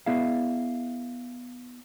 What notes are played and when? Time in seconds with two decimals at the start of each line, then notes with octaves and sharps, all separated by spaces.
0.06 B3 E4 G#4 D5 E5 F5